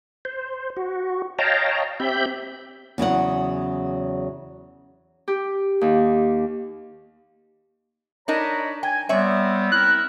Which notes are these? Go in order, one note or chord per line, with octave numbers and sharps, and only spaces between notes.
C5
F#4
C#5 D#5 F5 G5 A5 A#5
C4 G4 E5 B5 G6
E2 C#3 F#3 F#5
G4
D#2
D4 D#4 A#4 C#5 A#5 B5
G5 G#5
G3 B3 C4 C#5 D5 E5
C4 E4 A#4 F#6